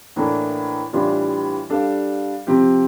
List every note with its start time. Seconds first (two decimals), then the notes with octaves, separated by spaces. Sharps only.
0.16 A2 E3 A#3 D4 A4
0.93 A2 E3 G3 D4 F4
1.70 G3 D4 A4 D5 F5
2.47 C3 F3 C4 G4